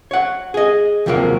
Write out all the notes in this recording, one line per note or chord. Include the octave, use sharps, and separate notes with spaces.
C#5 F#5
G#4 D#5
D#2 C3 F3 F#3 A#3 A#4